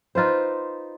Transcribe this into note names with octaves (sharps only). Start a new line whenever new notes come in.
D#4 F4 B4 C5